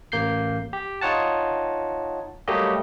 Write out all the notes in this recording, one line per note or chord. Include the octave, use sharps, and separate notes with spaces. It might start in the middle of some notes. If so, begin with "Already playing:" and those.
A1 A#3 G6 C7
G4
D#4 F4 C#5 F#5 A5
F#3 G3 A3 A#3 G4 D#5